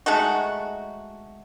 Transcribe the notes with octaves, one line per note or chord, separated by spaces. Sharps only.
G#3 A3 D#4 F#4